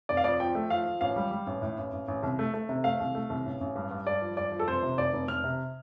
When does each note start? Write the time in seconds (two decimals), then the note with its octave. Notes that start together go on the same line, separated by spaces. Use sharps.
0.09 F1 D5
0.17 F5
0.24 F2 D5
0.40 F3 G5
0.55 A3
0.70 F3 F5
0.86 F3
1.01 A1 F5
1.16 G3
1.31 G3
1.47 A1
1.62 A2
1.78 A1
1.93 A1
2.08 A1
2.23 C2
2.39 A3
2.54 A3
2.69 C3
2.84 A3 F5
3.00 C2
3.15 A3
3.30 C2
3.46 A1
3.61 A1
3.76 G2
3.91 G2
4.06 G2 D5
4.22 F3
4.37 G2 D5
4.52 F3
4.59 A4
4.68 F1 C5
4.83 C3
4.98 F1 D5
5.13 F1
5.28 F1 F6
5.44 C3